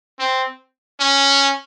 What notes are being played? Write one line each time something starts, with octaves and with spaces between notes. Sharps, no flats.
C4
C#4